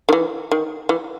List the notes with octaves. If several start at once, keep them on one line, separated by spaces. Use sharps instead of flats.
D#3
E3
D#3
E3